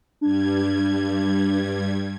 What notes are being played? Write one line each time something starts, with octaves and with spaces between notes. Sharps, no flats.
G2 G3 D4 G#6